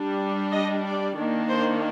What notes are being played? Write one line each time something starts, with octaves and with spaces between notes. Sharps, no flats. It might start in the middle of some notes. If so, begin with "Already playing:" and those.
Already playing: G3 D4
D#5
D5
D#3 A#3 D4
C5